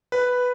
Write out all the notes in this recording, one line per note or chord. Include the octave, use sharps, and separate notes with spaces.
B4